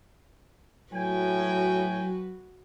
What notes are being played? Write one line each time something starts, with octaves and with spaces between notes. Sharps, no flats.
A2 F#3 F#4 B4 G5 G#5